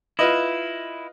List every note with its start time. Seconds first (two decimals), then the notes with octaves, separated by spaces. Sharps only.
0.19 E4 F4 B4 D#5